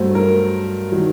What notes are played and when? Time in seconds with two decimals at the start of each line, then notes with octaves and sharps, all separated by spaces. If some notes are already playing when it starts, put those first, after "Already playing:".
Already playing: G2 F#3 A3 C5
0.15 A#4
0.92 D#3 F#3